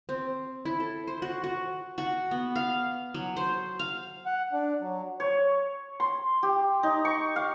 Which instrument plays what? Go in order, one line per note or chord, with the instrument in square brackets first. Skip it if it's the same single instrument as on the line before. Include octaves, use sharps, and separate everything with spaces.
[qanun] C4
E4
A4
C5
F#4
F#4
F#4
B3
F5
F#3
C5
F5
[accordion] F#5
D4
F#3
[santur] C#5
C6
G4
D#4
C#6
F5